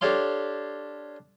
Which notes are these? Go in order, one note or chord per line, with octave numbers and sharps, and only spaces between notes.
D4 G4 A4 C#5 F5 C6